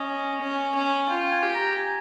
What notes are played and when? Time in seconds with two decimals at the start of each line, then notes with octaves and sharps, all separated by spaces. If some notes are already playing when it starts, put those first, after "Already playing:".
Already playing: C#4 D#5
0.41 C#4
0.75 C#4
1.09 F4 G5
1.25 G5
1.32 G#5
1.43 G4
1.55 A#5
1.77 G#5